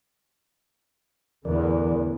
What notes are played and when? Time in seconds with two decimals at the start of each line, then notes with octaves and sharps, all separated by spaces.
1.45 E2 A2 D3 E3 A#4 D5